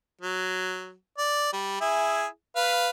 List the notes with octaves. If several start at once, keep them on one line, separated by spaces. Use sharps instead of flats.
F#3
D5
G3
E4 G#4
B4 F5